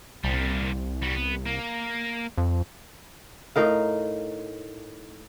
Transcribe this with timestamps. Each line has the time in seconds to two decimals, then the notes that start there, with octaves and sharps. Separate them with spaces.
0.24 C2 A#2 G3
1.02 G3 F#4
1.15 B3
1.46 A#3
2.37 F2
3.56 A2 D#4 A#4 F5